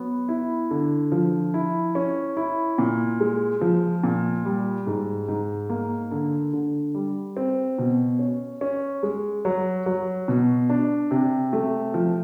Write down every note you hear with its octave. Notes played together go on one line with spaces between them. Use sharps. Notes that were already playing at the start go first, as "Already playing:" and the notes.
Already playing: F#3 B3
E4
D3
F3
E4
C#4
E4
A#2
G#3
F3
A#2
G3
G#2
G#2
A#3
D3
D3
G3
C4
B2
C#4
C#4
G#3
F#3
F#3
B2
D4
C3
A3
F3